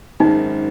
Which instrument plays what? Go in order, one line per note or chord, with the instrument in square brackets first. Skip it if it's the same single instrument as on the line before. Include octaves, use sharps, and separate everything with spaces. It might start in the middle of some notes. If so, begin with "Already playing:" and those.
[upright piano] G#1 F#2 D#3 G#3 [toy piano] D#4